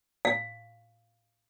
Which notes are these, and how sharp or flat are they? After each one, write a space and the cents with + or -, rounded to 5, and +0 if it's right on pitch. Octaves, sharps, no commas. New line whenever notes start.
F5 +0